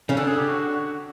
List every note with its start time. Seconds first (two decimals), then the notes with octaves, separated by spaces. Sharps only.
0.09 C#3 C#4
0.16 D3 D4 A4
0.27 G#4
0.39 G4
0.50 F#4